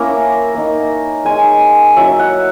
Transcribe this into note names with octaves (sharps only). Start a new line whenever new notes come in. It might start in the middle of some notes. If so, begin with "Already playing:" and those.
Already playing: A#3 C#4 E4 A#5
A#3 D#4
G#3 D#4 G#5
F#3 C#4 E4 E5
F#5